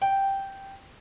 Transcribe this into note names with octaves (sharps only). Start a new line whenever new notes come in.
G5